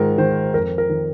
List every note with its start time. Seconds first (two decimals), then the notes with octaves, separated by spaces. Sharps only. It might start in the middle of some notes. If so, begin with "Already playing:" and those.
Already playing: G#2 D#3 F4 A#4
0.18 D#3 C5
0.54 F2 A#4
0.78 A#4
0.89 D#3